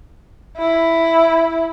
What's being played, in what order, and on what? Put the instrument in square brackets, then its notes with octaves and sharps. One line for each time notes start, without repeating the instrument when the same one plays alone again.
[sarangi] E4